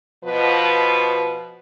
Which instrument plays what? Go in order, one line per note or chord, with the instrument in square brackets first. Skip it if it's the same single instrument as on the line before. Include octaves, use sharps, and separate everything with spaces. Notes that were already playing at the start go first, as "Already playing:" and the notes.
[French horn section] B2 F3 B4